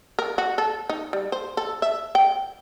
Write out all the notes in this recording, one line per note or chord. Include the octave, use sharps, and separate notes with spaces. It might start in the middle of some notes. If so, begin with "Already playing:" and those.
A#4
F#4
A4
D#4
G3
C5
A4
E5
G5